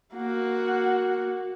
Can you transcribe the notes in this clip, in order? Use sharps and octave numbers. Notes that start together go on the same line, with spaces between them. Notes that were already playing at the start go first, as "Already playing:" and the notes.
A#3 F#4